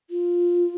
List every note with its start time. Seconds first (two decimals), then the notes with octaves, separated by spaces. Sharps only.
0.10 F4